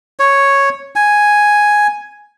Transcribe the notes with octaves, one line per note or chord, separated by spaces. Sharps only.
C#5
G#5